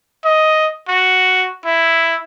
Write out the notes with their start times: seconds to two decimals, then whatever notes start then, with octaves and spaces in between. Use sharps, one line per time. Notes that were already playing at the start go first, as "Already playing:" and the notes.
0.24 D#5
0.88 F#4
1.65 E4